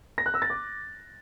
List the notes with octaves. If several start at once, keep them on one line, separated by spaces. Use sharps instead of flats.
A#6
F#6
E6
A6
D6